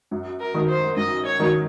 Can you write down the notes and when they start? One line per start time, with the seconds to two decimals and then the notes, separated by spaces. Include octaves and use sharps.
0.11 F#2
0.40 A#4
0.54 D#3 F#3
0.68 C5
0.97 F#2 D#5
1.25 C#5
1.39 D#3 F#3